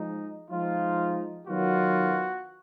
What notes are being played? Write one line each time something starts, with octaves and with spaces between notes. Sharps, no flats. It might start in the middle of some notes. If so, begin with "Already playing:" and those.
Already playing: F3 G#3 D#4
F3 G#3 D#4 F4
D#3 F#3 B3 F4 F#4